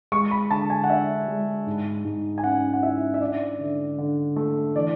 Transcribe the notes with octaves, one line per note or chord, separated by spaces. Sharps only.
G#3 C#6
B5
D3 A5
G#5
F#5
D4 E5
G#3
G#2
G#2
G#5
C#4 F#5
F#5
E4 E5
E5
D4 D5
D3
D3
A3
E3 D5